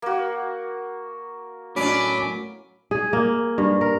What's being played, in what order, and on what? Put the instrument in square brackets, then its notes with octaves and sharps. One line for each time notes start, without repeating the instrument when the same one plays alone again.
[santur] A#3 F#4
[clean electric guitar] A2 F#3 [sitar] C#4 D4 [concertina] B5 D6
[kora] G#4
A#3
G2
A#4